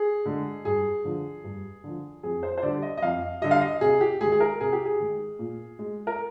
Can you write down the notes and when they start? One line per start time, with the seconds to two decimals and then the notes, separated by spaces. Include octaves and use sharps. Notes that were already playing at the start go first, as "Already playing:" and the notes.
Already playing: G#4
0.25 D3 G#3
0.65 G2 G#4
1.05 D3 F3
1.44 G2
1.84 D3 F3
2.23 F2 G#4
2.43 C5
2.58 C5
2.62 D3 G3 D5
2.82 D#5
2.97 D#5
3.02 F2 F5
3.41 D3 G3 D#5
3.51 F5
3.61 D#5
3.81 C3 G#4
4.01 G4
4.21 G#3 G#4
4.25 D#3
4.32 G#4
4.40 A#4
4.60 C3 G#4
4.73 G4
4.86 G#4
5.00 D#3 G#3
5.39 A#2
5.79 G#3
6.07 A#4